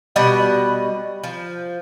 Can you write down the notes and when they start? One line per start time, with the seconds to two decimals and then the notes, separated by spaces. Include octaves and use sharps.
0.16 B2 G3 D#5 F#5
1.24 F3